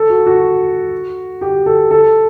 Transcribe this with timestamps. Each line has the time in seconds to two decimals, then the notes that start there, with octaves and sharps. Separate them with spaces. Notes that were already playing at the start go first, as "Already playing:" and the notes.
Already playing: A4
0.10 F#4
0.26 F#4
1.41 G4
1.66 A4
1.91 A4